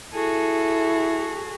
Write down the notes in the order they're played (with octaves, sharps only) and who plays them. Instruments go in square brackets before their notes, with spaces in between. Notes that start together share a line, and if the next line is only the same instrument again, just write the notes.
[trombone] E4 [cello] F#4 G#4 [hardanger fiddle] A4